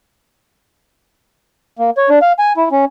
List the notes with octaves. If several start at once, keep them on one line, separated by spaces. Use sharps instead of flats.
A#3
C#5
D4
F5
G#5
E4
C#4